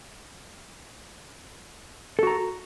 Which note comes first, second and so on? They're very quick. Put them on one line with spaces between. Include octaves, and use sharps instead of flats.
A4 F#4 A#5